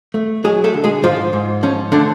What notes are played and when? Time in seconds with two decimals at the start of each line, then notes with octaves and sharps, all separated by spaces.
0.14 A3
0.44 F#3 G#3 G#4
0.64 A3 A4
0.74 D3
0.84 G#3 G#4
1.03 G#2 F3 F4
1.33 G#2
1.63 F3 C#4
1.92 D3 A3 D4